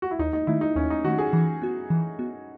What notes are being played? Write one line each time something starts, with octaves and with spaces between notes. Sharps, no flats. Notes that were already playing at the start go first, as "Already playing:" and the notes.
F#4
E4
D#2 D#4
D#4
D#3 A3 E4
D#4
D#2 C#4
D#4
D#3 A3 F#4
G#4
E3
B3 F#4
E3
B3 F#4